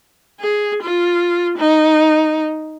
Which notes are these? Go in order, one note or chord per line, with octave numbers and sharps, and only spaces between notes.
G#4
F4
D#4